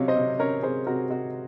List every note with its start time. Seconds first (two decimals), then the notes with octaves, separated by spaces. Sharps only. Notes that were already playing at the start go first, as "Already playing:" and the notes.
Already playing: C3 F#3 C#4 C#5 F5
0.08 C5 D#5
0.16 C3
0.39 C#4 A#4 C#5
0.63 C3 G#4 C5
0.87 C3 F#4 A#4
1.10 C3 F#4